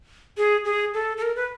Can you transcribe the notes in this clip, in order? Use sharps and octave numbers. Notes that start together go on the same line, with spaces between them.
G#4
G#4
A4
A4
A#4
B4